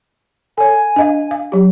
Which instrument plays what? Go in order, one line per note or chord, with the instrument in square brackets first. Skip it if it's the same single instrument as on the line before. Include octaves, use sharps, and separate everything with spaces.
[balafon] A4 C#5 [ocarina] G#5
[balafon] D4 D#5 F5
F5
F#3 G4